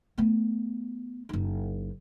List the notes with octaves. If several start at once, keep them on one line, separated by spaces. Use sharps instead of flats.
A3 B3
F#1 D#4